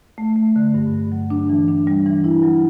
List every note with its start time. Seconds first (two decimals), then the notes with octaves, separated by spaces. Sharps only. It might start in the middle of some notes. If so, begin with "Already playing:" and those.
0.18 A3
0.36 A3
0.56 D3
0.74 G2
0.93 G2
1.12 F#3
1.30 D4
1.49 E3
1.69 D4
1.87 G3
2.06 E3
2.24 E4
2.43 F#3